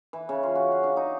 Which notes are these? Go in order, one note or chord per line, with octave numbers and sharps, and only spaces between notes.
E3
C#3
F4
F#4
F5
D4
D#4